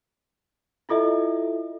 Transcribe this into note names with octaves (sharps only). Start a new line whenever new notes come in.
E4 F4 A4 D#5 E5